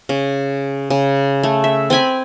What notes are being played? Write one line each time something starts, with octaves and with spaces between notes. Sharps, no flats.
C#3
C#3
A3
E5
C4 G5 G#5 B5